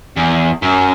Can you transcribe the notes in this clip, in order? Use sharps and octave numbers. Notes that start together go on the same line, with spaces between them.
E2
F#2